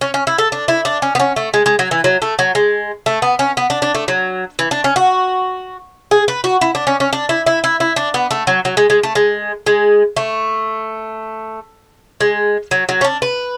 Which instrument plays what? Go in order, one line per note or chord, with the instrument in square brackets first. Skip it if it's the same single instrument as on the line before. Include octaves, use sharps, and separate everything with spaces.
[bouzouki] C#4
C#4
E4
A4
D4
E4
D4
C#4
B3
C#4
A3
G#3
G#3
F#3
E3
F#3
A3
F#3
G#3
A3
B3
C#4
B3
D4
D4
A3
F#3
E3
D4
C#4
F#4
G#4
B4
F#4
E4
D4
C#4
C#4
D4
E4
E4
E4
E4
D4
B3
A3
F#3
F#3
G#3
G#3
A3
G#3
G#3
A3
G#3
F#3
F#3
C#4
D4
B4